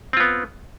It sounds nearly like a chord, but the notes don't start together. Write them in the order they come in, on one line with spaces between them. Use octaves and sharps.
C4 F4 B3